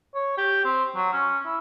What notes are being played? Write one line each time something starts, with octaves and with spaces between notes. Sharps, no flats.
C#5
G4
C4
F#3
C#4
E4